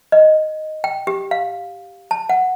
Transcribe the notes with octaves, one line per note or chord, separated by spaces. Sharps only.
D#5
G5
G4
F5
A5
F#5